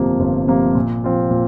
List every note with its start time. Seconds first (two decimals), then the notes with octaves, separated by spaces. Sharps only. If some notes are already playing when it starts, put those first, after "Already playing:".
Already playing: G1 F2 C3 F3 A#3
0.20 G1
0.47 F2 C3 F3 A#3
0.75 A#2
1.04 F3 C4 F4
1.31 A#2